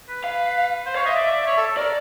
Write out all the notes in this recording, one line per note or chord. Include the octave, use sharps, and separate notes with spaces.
B4
F5
C5
C#5 F5
D#5 E5
D5
D5
C#5
A4
A4
A#4 D5